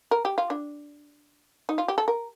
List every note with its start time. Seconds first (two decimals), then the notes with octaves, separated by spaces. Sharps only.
0.11 A#4
0.25 G4
0.38 F4
0.50 D4
1.69 D#4
1.78 F4
1.88 G4
1.98 A4
2.08 A#4